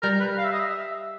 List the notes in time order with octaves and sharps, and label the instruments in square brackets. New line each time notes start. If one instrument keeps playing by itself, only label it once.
[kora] G3 [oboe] A#4
[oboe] B4
F5
E5
D#5
E5